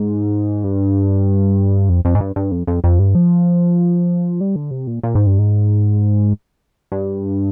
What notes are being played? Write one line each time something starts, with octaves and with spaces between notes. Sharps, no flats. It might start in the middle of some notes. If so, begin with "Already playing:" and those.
Already playing: G#2
G2
F2
F2
G#2
G2
G2
F2
F2
F2
G2
F3
G3
D3
C3
A#2
A#2
G#2
G2
G#2
G2